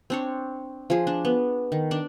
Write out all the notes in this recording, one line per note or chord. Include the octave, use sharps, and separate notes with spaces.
C4 D4 C#5
F3 G#4
D4
B3
D#3
D4 D5